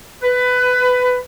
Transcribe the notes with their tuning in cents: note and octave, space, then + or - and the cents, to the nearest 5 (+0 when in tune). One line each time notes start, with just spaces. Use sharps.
B4 +15